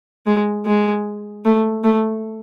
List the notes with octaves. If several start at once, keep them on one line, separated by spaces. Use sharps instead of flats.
G#3
G#3
A3
A3